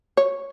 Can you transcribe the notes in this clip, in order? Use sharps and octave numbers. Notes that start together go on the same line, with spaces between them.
C#5